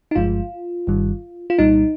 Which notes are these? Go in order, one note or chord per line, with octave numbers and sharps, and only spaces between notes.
D#4
G1 G2 F3 G#3 F4
G1 G2 D#3 G3
F4
C2 A#2 G3 D#4